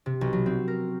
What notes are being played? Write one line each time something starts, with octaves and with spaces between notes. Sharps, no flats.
C3
B1
F#3
C4
A#4